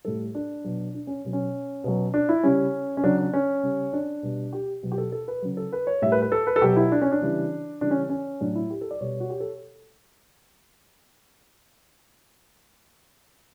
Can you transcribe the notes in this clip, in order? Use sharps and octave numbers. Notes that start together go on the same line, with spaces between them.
A2 G3 A4
D4
B2 F#3
D4
C#4
B2 F#3
C#4
B2 F#3
D4
E4
C#3 G3 C#4
C#4
C#3 F#3 D4
D4
C#4
C#3 G3
D4
B2 G3
G4
B2 F#3
G4
A4
A4
B4
C#3 F#3
A4
B4
C#5
A2 G3 E5
B4
B4
A4
B4
A4
B2 F#3 G4
E4
D4
C#4
D4
C#3 E3 G3
C#3 E3 G3 D4
C#4
C#4
A2 F#3 D4
E4
G4
A4
D5
B2 G3 C#5
F#4
G4
A4